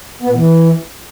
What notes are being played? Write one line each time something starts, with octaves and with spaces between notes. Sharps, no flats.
B3
A#2
E3